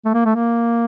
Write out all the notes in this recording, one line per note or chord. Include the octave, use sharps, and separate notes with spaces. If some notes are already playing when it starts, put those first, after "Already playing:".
A3
A#3
A3
A#3